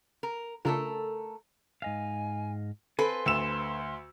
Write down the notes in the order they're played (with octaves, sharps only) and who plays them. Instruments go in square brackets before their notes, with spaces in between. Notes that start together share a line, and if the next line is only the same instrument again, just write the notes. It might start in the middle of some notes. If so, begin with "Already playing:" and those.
[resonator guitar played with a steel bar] A#4
[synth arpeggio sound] C#3 D4 F4 [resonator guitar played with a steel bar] A3 A4 A#4
[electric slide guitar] G#2 D#5 F5 [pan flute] G#5
[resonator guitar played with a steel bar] C4 A4 B4 [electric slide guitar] F5 G#5 [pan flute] C6
[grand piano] D2 E6 E7